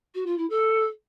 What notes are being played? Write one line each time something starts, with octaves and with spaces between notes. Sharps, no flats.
F#4
F4
E4
A4